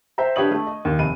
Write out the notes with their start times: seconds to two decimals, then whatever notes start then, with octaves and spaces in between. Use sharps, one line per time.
0.18 C5 E5 G5 A#5
0.36 D4 G4 B4 C#5 D#6 F#7
0.51 A3
0.67 D#5
0.85 D#2
0.99 F1 D#7